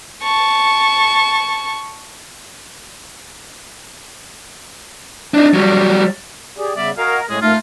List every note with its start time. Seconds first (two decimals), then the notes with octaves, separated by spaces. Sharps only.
0.23 A5 C#6
5.34 D4 D#4
5.54 F#3 G3
6.58 G4 G#4 D5
6.76 C#3 G3 B3 D5 E5
6.97 F#4 A#4 D#5 F5 G#5
7.30 A2 G#3 A3 C#4 G#4 D#5
7.42 F2 A3 A#3 D#4 F4 F6